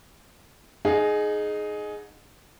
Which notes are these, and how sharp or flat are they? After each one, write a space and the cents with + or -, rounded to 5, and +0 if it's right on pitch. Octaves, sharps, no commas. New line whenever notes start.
D#4 -15 G#4 +15 F#5 -35